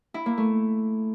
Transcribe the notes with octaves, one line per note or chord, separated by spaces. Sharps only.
E4
A#3
A3